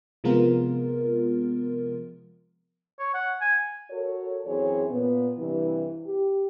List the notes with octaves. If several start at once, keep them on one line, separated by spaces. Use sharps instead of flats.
C3 F3 G#3 B3 F4 A#4
C#5
F#5
G#5
F#4 A4 A#4 C#5
F#2 E3 C4 G#4 C#5
A#2 B3
G2 C3 E3
G4